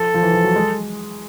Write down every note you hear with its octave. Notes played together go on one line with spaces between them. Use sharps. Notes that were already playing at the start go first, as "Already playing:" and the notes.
Already playing: F3 A4
F3
E3
F3
F#3
G#3